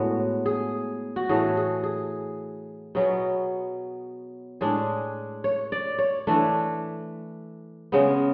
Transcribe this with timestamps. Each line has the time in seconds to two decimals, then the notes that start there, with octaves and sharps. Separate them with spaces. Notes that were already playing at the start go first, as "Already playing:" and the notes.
Already playing: A2 G#3 B3 F#4
0.46 G#4
1.16 F#4
1.29 A2 E3 A3 G#4
1.57 G#4
1.84 G#4
2.95 B2 F#3 B3 G#4
4.61 A2 G#3 D4 G#4
5.44 C#5
5.72 D5
5.99 C#5
6.27 E3 A3 D4
7.92 C#3 G#3 B3